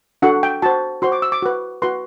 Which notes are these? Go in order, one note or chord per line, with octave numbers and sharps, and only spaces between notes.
D4 F#4 A4 F#5
G5
F#4 C5 A5
F#4 C5 C6
D6
E6
D6
F#4 B4
F#4 B4 C6